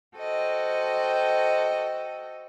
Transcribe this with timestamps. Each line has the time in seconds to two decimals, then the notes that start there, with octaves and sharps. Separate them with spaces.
0.17 F#4 A4 C5 D#5 G5